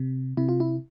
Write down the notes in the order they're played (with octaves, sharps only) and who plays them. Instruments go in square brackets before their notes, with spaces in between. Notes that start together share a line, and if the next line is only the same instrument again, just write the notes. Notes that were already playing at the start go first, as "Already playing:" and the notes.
Already playing: [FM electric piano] C3
C3 E4
F4
E4